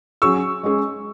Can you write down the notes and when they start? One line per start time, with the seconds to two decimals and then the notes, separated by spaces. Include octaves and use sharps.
0.22 F#3 C#4 G#4 C#6 E6
0.63 G#3 C#4 G#4